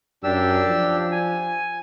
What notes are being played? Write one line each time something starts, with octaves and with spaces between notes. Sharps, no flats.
F#2 D4 G4 E6
F3
G#5